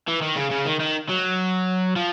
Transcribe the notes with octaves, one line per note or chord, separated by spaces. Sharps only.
E3
D#3
C#3
C#3
D#3
D#3
F#3
F3